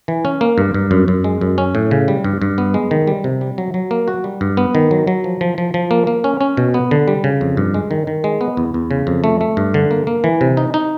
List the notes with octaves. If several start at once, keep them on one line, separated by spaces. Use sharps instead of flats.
E3
C#4
A#3
G2
G2
F#2
F#2
G#3
F#2
C#4
A2
C#3
G3
G2
G2
B3
G#3
D#3
G3
C3
G3
F#3
F#3
A#3
F#4
G3
G2
B3
D#3
F#3
F#3
F3
F3
F3
F3
A#3
A#3
C#4
C#4
B2
B3
D3
G3
C#3
F2
G2
G#3
D#3
D#3
G#3
B3
E2
E2
C#3
F2
A3
A3
G2
D3
A#3
A#3
E3
C3
D#4
D#4